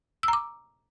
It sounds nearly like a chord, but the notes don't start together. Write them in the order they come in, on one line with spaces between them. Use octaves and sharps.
E6 A#5 D6